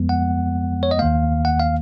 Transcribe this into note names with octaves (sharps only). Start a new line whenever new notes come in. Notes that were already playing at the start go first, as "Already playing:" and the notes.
Already playing: F2 F3 G#3 B3
F#5
C#5
D#5
D#2 D#3 A#3 F5
F#5
F5